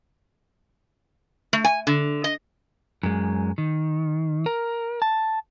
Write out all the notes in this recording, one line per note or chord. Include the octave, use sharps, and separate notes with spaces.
A3
G#5
D3
D#5
F#2 G#3
D#3
A#4
A5